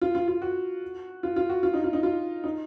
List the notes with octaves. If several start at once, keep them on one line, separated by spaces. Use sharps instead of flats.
F4
F4
F4
F#4
F4
F4
F#4
F4
D#4
F4
D#4
F4
D#4